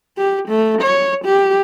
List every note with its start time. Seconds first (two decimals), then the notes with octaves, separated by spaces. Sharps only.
0.18 G4
0.49 A3
0.82 C#5
1.25 G4